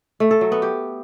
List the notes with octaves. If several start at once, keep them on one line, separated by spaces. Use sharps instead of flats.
A3
A4
F#3
B3
G4